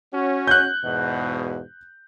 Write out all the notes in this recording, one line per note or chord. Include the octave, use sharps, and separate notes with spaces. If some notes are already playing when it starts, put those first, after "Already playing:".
C#4 F#4
F#6 G6
E2 G#2 B2